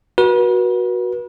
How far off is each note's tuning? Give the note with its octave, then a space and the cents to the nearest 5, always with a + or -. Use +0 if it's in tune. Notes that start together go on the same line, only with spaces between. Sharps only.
F#4 -5 B4 -40